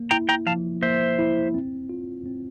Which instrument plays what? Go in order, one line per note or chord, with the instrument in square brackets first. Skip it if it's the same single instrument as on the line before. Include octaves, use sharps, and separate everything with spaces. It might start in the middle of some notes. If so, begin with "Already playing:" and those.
Already playing: [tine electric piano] A#3
[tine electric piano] E4 [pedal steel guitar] G5 A#5
[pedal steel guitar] G5 A#5
[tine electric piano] F3 [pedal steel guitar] F5 A5
[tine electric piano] A#3 [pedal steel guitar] C5 E5
[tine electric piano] E4
C4
F4
C4